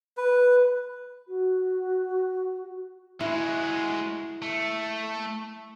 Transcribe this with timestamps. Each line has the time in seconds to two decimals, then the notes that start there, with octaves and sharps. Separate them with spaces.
0.17 B4
1.28 F#4
3.21 G#3 E4 F#4
4.42 A3